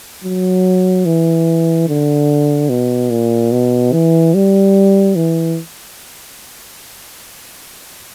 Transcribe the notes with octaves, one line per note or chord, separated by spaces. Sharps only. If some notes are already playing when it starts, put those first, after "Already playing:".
F#3
E3
D3
B2
A#2
B2
E3
G3
E3